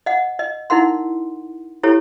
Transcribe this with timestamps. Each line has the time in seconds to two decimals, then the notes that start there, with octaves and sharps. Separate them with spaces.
0.06 D#5 F#5
0.39 D#5
0.70 D#4 E4 A#4 F#5 C6
1.83 E4 G4 A4 C#5